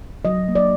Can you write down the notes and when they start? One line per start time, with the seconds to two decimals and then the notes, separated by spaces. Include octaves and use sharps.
0.25 F#3 D#5
0.48 A#3
0.55 D5